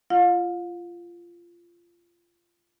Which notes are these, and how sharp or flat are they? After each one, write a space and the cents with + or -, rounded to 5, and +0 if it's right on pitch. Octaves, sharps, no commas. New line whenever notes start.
F4 -20 F5 +40